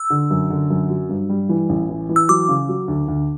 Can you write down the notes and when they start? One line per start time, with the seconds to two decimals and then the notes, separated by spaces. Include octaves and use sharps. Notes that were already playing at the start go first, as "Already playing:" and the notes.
Already playing: E6
0.10 D3
0.30 F#2
0.50 D3
0.70 F#2
0.90 F#3
1.09 G2
1.29 G3
1.49 E3
1.69 A1
1.89 E3
2.09 E3
2.16 E6
2.29 F#3 D6
2.48 C#3
2.69 F#3
2.88 D2
3.08 D2